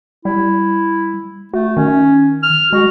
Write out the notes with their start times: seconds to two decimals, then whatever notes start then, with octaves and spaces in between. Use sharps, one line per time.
0.25 G3 E4
1.53 A3 F#4
1.77 D#3 C#4
2.43 F6
2.73 G#3 F#4